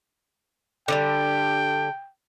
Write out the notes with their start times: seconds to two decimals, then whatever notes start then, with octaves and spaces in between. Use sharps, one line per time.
0.88 D3 F3 G3 G5